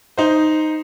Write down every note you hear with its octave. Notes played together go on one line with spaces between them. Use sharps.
D#4 C5